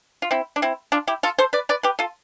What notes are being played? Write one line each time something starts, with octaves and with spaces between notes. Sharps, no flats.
F4
C4 E4
D4
C4 E4
D4 F4
E4 G4
F4 A4
A4 C5
B4 D5
B4 D5
G4 B4
F4 A4